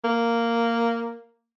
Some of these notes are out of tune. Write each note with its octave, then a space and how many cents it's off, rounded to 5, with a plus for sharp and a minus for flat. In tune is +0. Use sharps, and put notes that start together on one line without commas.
A#3 -10